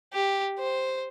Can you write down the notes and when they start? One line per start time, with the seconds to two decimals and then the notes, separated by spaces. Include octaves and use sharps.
0.13 G4
0.59 C5